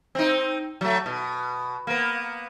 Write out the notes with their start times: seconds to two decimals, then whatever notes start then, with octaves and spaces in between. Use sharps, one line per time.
0.15 C4 D#4
0.81 F#3 A3
1.06 B2
1.87 A#3 B3